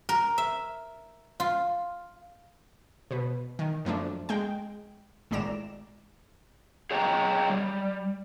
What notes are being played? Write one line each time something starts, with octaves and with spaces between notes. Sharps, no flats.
A#4
E5
F4
B2 B4
D#3
F#2 F3 A3 D4
G#3 G5
G#1 A2 G#3 D5 A#5 E7
G#4 C#5 D#5 G5 G#5 A#5
G3